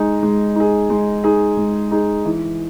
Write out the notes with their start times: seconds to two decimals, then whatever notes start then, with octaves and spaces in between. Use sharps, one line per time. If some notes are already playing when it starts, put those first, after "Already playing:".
Already playing: G#3 D#4 G#4
0.23 G#3
0.56 D#4 G#4
0.90 G#3
1.24 D#4 G#4
1.57 G#3
1.91 D#4 G#4
2.25 E3